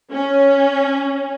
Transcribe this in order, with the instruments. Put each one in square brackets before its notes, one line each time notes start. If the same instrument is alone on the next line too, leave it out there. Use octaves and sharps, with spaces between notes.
[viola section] C#4